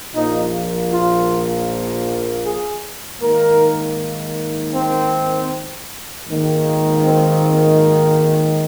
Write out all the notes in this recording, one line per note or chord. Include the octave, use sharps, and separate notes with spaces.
A#1 A#2 F3 A#3 D#4
F4
G#4
G#2 D#3 A#3 A#4
C4
G#1 G#2 D#3 A#3
C4